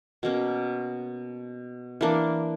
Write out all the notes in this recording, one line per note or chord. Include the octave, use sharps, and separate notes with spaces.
B2 A#3 C#4
E3 A#3 D4